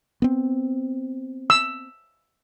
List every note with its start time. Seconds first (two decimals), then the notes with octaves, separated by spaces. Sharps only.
0.22 B3 C4
1.50 E6